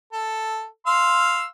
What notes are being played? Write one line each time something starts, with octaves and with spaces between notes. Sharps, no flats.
A4
F5 C6 E6